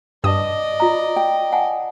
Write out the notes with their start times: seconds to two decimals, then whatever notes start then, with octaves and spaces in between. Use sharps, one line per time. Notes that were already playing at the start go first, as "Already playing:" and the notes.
0.24 G2 B4 D5 D#5 A5 D#6
0.80 F4 A#5
1.16 G5
1.52 F#5 G#5 A5